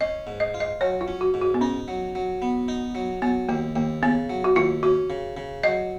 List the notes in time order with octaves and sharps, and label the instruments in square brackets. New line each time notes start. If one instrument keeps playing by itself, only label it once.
[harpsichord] C#4 [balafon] D#5
[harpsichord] G#2
[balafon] D#5
[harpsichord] F4
[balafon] D#5
[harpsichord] F#3 [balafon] C#5
[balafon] F4
[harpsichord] C#4
[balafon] F#4
[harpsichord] G#2
[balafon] F#4
B3
[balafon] C#4 [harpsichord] D#4
[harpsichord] F#3
F#3
B3
D#4
F#3
[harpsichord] F#3 [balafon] B3
[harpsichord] D#2 [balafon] A#3
[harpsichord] D#2 [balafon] A#3
[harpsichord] C#3 [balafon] B3
[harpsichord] F#3
[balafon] F#4
[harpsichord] D#2 [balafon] F4
[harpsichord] C#4 [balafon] F#4
[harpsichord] C#3
C#3
[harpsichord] F#3 [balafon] D#5